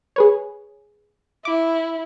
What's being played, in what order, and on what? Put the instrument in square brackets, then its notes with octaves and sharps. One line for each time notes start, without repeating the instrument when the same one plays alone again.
[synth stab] G#4 B4 C#5
[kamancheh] E4 [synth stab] D6